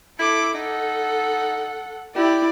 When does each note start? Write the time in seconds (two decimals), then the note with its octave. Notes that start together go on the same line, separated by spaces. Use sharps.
0.19 E4 A4 D6
0.54 D#4 A4 F#5
2.16 E4 G4 D5